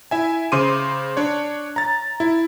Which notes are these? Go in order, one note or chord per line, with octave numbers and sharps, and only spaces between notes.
E4 E5 G#5
C#3 C5 C6 D6 D#7
D4 C#5
A#5 A6
E4